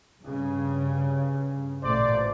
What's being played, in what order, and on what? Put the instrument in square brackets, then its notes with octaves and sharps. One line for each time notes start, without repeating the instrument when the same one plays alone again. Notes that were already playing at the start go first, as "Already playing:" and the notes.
[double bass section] G2 C#3
[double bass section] A1 A#2 A3 [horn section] C5 D5